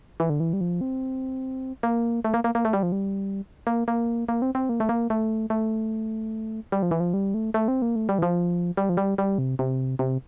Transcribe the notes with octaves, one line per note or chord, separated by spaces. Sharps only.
E3
D3
E3
G3
F3
C4
A#3
A3
A#3
A#3
A#3
A3
G3
F3
G3
A#3
A#3
A#3
C4
C4
A#3
A3
A#3
A3
A3
G3
F3
E3
F3
G3
A3
A3
C4
A#3
A3
G3
E3
F3
G3
F3
G3
G3
C3
C3
C3